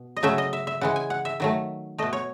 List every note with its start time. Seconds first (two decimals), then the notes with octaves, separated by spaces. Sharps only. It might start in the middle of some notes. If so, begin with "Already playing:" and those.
Already playing: B2
0.17 D#5
0.23 C#3 F#3 A3 E5
0.38 D#5
0.53 E5
0.67 E5
0.81 C#3 E3 G#3 F#5
0.96 G#5
1.10 F#5
1.25 E5
1.40 D#3 F#3 A3
1.98 B2 A3 D#5
2.13 C#5